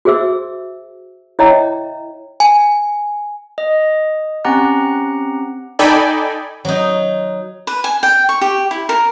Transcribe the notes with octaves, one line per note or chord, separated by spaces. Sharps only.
F#4 G#4 C5 E5 E6
E4 C#5 D#5 E5 G5 A#5
G#5
D#5
C4 C#4 G4 F#5 A#5 F#6
D#4 A4 D5 G5 G#5 B5
F#3 D#4
B4
G#5
G5
C#6
G4
E4
A#4